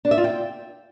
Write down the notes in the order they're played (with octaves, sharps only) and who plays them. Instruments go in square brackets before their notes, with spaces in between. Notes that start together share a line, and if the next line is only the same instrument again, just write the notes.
[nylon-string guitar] D4
E5
F4
G5